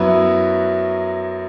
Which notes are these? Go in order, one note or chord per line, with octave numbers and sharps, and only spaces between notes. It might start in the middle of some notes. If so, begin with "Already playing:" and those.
Already playing: F#2 F#3 B3 E4